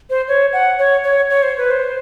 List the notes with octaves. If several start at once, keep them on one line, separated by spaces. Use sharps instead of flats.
C5
C#5
F#5
C#5
C#5
C#5
C5
B4
C5